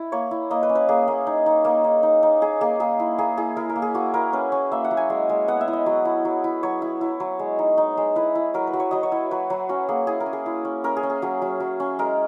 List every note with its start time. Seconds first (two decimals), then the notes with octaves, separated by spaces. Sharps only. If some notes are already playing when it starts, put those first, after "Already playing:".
Already playing: E4
0.12 A#3 C#5
0.31 E4
0.50 A#3 D#5
0.63 B4
0.69 C#4
0.75 B4
0.88 A#3 G#4
1.08 A#3
1.27 D#4
1.46 D#4
1.65 A#3
1.84 D#4
2.03 D#4
2.23 D#4
2.42 D#4 G#4
2.61 A#3 G#4
2.80 A#3 G#4
3.00 E4
3.18 A#3 G#4
3.37 E4 G#4
3.57 E4 A#4
3.69 A#4
3.76 A#3
3.82 G#4
3.94 A#3 F#4
4.14 E4 A#4
4.33 C#4 B4
4.52 C#4
4.72 A#3 E5
4.84 F#5
4.91 F#3
4.97 G#5
5.10 G#3
5.29 G#3
5.48 B3 F#5
5.61 E5
5.68 E4
5.73 D#5
5.86 F#3
6.05 E4
6.25 F#3
6.44 E4
6.63 F#3 C#5
6.82 E4
7.01 E4
7.20 F#3
7.39 G#3
7.59 D#4
7.78 D#4
7.97 G#3
8.16 E4 B4
8.35 E4
8.54 F#3 A#4
8.67 B4
8.73 F#3
8.80 C#5
8.91 F#3 D#5
9.03 C#5
9.12 E4
9.31 F#3 B4
9.50 F#3
9.69 C#4 F#4
9.89 A#3 G#4
10.07 E4 G#4
10.20 A#4
10.26 C#4
10.33 G#4
10.46 E4
10.65 C#4
10.84 C#4 A#4
10.97 G#4
11.03 C#4
11.10 G#4
11.22 F#3 G#4
11.42 F#3
11.60 F#3
11.80 C#4
11.99 G#3 A#4